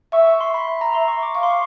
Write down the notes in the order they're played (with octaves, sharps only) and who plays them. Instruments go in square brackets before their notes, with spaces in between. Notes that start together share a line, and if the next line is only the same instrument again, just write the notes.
[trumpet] E5 [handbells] C#6
[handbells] C#6
C6
B5
B5
A#5
[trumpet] E5 [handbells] C6
[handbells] C#6
D6
[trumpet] F5 [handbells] C#6
[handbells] C6
C#6